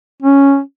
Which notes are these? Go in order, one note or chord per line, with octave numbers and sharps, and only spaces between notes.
C#4